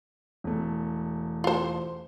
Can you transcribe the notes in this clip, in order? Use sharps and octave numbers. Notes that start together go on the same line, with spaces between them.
E1 A3
F4 C5